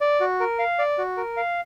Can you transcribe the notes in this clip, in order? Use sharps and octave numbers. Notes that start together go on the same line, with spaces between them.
D5
F#4
A#4
F5
D5
F#4
A#4
F5